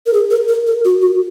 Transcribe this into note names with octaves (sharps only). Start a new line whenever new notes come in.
A#4
G#4
A#4
A#4
A#4
F#4
F#4